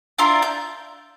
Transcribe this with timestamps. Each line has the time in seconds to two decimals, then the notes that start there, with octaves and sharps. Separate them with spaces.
0.18 D4 E4 F4 A#5
0.42 G6